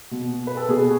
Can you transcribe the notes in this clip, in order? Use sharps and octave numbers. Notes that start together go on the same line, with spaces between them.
B2
B4
A4
B2 G#4